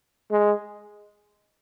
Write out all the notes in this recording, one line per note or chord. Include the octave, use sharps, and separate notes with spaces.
G#3